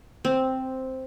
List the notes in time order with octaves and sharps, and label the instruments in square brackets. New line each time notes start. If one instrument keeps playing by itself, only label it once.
[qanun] C4